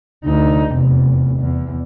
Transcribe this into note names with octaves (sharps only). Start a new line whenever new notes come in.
D2 D#4
F1 E2
E2